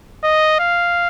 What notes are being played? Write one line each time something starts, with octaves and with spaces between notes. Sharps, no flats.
D#5
F5